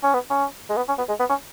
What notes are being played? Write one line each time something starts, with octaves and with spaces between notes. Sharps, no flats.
C#4
B3
C#4
G#3
B3
C#4
B3
G#3
B3
C#4